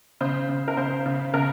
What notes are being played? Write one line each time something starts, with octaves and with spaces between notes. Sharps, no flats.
C#3 C5
C#3
A#4
C#3 C5
C#3
C#3 A#4